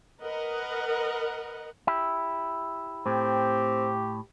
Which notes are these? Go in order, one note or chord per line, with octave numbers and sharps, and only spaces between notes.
A#4 B4 D#5 F#5
E4 G4
A2 C4 G4